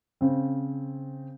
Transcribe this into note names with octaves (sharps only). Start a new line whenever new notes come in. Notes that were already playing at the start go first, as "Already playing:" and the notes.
C#3 C4